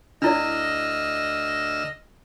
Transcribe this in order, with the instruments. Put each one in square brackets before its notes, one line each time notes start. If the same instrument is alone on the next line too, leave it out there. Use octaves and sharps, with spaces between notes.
[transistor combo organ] D2 E6 F6 [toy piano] D4 E4 D5 [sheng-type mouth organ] D#5